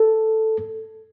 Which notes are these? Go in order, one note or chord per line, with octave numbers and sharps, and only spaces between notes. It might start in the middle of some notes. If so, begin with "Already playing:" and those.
Already playing: A4